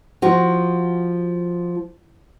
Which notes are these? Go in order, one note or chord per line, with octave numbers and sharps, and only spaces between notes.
F3 F#4